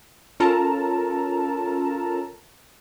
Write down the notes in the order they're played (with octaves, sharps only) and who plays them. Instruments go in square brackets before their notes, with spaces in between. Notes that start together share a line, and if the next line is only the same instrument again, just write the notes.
[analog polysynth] C#4 F4 A4 A#4 A5 A#5